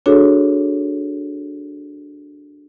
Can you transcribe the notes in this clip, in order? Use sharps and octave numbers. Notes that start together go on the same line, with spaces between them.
D4 F#4 G#4 A4 C#5